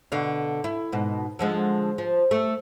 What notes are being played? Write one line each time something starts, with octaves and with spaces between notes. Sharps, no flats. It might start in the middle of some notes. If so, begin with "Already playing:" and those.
B2 D3 F5
E4
G#2 B2
D3 F3 G#3
F3
A3